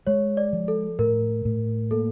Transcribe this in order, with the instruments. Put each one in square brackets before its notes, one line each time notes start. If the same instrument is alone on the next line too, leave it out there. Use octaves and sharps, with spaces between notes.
[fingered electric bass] G#3 [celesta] C#5
[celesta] D5
[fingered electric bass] F3
[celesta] A4
[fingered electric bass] A2 [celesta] A#4
[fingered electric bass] A2
[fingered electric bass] A#3 [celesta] A4